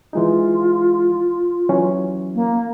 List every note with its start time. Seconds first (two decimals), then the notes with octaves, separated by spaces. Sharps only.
0.13 E3 G#3 D#4 F4
1.69 E3 F#3 C#4
2.35 A#3